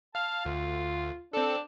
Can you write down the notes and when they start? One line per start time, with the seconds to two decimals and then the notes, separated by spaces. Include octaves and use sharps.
0.15 F5 A5 F6
0.46 D2 F4
1.33 C4 D4 A4